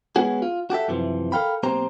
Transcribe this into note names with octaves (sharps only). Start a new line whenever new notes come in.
G#3 B3 C#4 F#4 G#4
F4
F#4 G4 A4 E5
F#2 C3 E3 F3
A4 A#4 F5 G5 B5
B1 A#3 C4 G4 C5 A#5